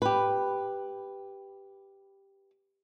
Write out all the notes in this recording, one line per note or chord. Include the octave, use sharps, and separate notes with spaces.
G4 B4